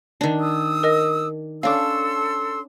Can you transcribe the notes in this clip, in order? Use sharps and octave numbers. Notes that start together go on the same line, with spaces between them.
D#3 D4
D#6 E6
A#4 D#5 A#6
C#4 D4 A4 F5 C6 D6 E6